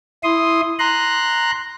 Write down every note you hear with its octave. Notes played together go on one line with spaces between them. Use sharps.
E4 C6 D#6
A#5 C6 F#6